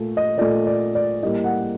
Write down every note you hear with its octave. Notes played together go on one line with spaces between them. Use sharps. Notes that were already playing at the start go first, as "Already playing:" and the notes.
Already playing: A#2 A3
D#5
A#2 A3 D5
D5
D5
A2 G3 A#3 D#5
F#5